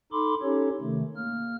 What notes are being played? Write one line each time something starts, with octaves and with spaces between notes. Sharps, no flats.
D#4 A4 B5 C6 D6
C#4 D#4 G4 A4 C#5
C3 D#3 A3
A#3 F6